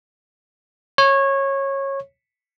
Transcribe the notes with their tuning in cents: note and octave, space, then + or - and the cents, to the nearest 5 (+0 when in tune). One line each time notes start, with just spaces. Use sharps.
C#5 -20